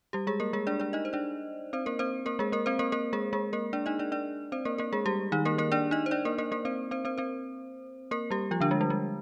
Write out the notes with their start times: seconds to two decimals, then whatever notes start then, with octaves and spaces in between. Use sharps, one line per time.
0.13 G3 G4
0.27 G#3 G#4
0.40 A#3 A#4
0.53 G#3 G#4
0.67 D4 D5
0.80 D4 D5
0.93 D#4 D#5
1.05 C5
1.13 D4 D5
1.73 C4 C5
1.86 A#3 A#4
1.99 C4 C5
2.26 A#3 A#4
2.39 G#3 G#4
2.52 A#3 A#4
2.66 C4 C5
2.79 A#3 A#4
2.92 A#3 A#4
3.13 G#3 G#4
3.33 G#3 G#4
3.53 A#3 A#4
3.73 D4 D5
3.86 D#4 D#5
3.99 D4 D5
4.12 D4 D5
4.52 C4 C5
4.65 A#3 A#4
4.78 A#3 A#4
4.93 G#3 G#4
5.06 G3 G4
5.32 D#3 D#4
5.45 A#3 A#4
5.58 A#3 A#4
5.72 D4 D5
5.91 D#4 D#5
6.06 C5
6.11 D4 D5
6.25 A#3 A#4
6.38 A#3 A#4
6.52 A#3 A#4
6.65 C4 C5
6.91 C4 C5
7.05 C4 C5
7.18 C4 C5
8.11 A#3 A#4
8.31 G3 G4
8.51 F3 F4
8.60 D3 D4
8.71 G#3
8.81 G3
8.90 G#3